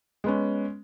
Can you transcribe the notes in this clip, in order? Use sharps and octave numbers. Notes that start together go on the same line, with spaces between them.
G#3 B3 C#4